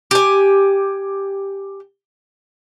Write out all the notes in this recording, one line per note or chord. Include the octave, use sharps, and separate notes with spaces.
G4 G#5